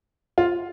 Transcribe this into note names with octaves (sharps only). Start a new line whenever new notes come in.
F4